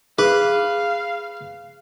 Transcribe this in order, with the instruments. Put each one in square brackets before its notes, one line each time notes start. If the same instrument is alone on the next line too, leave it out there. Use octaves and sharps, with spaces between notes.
[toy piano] G#4 [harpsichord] B4 [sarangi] F5